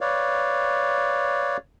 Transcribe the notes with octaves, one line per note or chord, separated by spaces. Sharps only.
B4 C#5 D5 F5